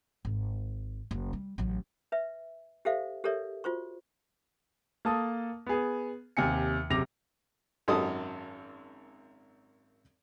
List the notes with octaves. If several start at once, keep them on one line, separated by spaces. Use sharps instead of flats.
G#1
F#1
G3
A1 F#3
B4 E5
G4 A4 C5 E5 F5
G4 A4 A#4 C#5 D5 E5
F4 F#4 C5 C#6
A#3 A4 A5 D#6
B3 G#4
D#2 C3 G#5 C#7
F#1 C3 D6 A#6 F7
G#1 F#2 A4 D#5 D#6